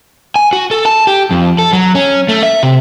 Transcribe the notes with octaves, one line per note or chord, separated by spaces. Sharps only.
G#5
F#4
A4
A5
G4
F2
A4
F#3
C#4
A3
E5
C3